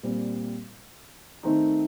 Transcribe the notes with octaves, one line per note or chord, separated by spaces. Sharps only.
A#2 G3 C4
D#3 A3 C4 D#4